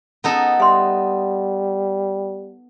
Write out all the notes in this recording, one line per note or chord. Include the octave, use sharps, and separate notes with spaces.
B3 D#4 A4
G3 E5 C6